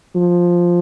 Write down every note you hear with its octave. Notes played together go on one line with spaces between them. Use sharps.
F3